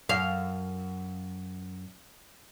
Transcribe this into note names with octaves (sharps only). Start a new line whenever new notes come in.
F#2 F5